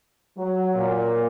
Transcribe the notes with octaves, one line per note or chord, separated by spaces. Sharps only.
F#3
A#2